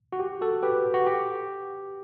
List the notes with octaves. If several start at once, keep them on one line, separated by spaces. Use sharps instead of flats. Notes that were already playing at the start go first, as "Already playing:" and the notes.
F#4
G4
F#4 A4
G4 B4
F#4
G4